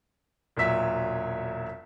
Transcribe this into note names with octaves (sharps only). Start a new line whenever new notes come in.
E1 A#2 F#3 E5 B6